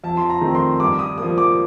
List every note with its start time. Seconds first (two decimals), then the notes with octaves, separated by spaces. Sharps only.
0.04 F2 A5
0.17 C6
0.30 A#5
0.41 D#3 A3 C4
0.55 C6
0.80 G2 D6
0.99 D#6
1.18 F3 A#3 D#6
1.38 D6